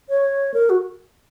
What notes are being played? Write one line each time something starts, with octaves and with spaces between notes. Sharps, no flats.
C#5
A#4
F#4